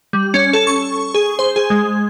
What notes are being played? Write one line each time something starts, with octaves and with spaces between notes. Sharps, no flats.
G3
C#4
A4
C#6
G#4
C5
G#4
G#3